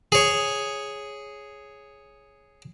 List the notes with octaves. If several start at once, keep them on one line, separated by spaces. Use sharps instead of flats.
G#4 C#5